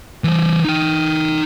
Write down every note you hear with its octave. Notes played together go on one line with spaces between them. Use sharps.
E3 C5
D#4 G5